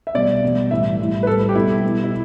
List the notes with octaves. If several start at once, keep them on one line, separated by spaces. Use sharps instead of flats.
E5
B2 G3 D5
B2 G3
A2 E3 G3 E5
A2 G3
B4
A2 G3 A4
G4
B2 G3 E4
B2 G3
E4